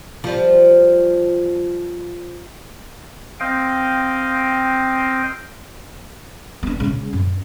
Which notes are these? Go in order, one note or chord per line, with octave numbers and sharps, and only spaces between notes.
F3 G3
C4 D#5 F5 G5
B3 D4
C#3 G#3
F#2